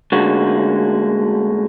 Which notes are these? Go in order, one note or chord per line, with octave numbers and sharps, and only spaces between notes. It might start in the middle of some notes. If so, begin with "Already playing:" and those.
D2 D3 G#3 A#3 C#4 F#4